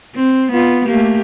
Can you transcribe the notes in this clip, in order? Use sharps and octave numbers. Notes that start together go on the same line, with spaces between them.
C4
B3 F4
A3 A#3 G4